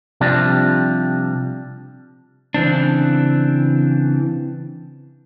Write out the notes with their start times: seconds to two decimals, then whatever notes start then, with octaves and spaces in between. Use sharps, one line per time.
0.21 C3 F3 G3 D4
2.54 C#3 E3 C4 D4